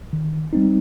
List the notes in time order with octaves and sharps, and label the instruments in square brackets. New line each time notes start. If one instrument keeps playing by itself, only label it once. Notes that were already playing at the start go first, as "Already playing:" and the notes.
[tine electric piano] D#3
G3 C4 D#4